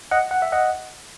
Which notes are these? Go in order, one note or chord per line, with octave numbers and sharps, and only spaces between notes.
D#5 F#5
F#5
E5
D#5 F#5